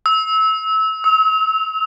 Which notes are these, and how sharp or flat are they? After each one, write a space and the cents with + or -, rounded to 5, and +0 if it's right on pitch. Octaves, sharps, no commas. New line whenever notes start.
E6 -25
E6 -45